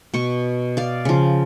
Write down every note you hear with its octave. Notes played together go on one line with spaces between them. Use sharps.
B2 C#6
D5 F5
C#3 F3